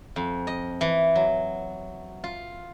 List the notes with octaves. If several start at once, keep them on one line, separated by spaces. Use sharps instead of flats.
F2
D#5
E3
F#3
F4